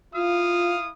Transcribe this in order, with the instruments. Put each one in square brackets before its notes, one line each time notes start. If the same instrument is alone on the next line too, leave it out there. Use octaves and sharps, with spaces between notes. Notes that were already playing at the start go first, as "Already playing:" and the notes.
[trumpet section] E4 F5 D#6 [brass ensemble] F4